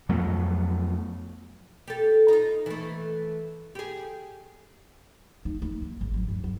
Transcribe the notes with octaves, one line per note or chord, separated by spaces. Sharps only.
F2 F#3 A3 B3
G4 A4
D#4 F4
E3 A3
G4 G#4
D#4
A#3
F#2
G#1
F#3
G2
F#3